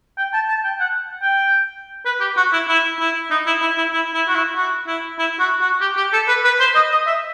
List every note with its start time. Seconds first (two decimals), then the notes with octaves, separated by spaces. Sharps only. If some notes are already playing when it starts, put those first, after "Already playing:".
0.18 G5
0.33 A5
0.48 A5
0.64 G5
0.80 F#5
1.22 G5
2.05 B4
2.20 G4
2.37 F#4
2.52 E4
2.68 E4
3.00 E4
3.30 D#4
3.47 E4
3.62 E4
3.78 E4
3.94 E4
4.14 E4
4.28 F#4
4.36 E4
4.56 F#4
4.87 E4
5.19 E4
5.39 F#4
5.61 F#4
5.81 G4
5.97 G4
6.13 A4
6.28 B4
6.45 B4
6.60 C5
6.75 D#5
6.91 D#5
7.07 E5